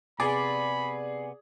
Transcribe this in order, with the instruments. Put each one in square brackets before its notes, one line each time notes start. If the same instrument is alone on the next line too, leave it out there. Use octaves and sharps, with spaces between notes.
[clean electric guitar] C3 B3 [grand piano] G#4 [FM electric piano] D5 [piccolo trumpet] B5